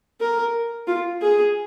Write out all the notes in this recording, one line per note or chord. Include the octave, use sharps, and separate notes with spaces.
A#4
F4
G#4